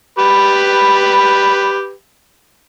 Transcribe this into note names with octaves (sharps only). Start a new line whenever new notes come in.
G4 B4 B5